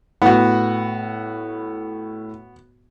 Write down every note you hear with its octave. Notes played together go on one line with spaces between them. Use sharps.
A2 B3 F#4